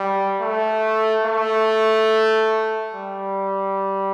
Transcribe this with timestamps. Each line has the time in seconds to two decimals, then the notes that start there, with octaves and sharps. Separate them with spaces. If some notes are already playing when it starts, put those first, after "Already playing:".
Already playing: G3
0.41 A3
1.25 A3
2.94 G3